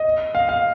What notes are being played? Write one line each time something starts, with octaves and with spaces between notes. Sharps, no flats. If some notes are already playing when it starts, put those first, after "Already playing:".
Already playing: D#5
F5
F5